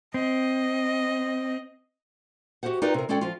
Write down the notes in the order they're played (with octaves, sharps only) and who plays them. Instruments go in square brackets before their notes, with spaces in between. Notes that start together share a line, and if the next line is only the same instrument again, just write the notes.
[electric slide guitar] C4 [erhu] D#5
[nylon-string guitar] F#4 G4 A4 C5 F#5
D#4 F4 G4 A#4 B4 D5
C3 A#4
G#3 C#4 A4 D5 G5
F3 F4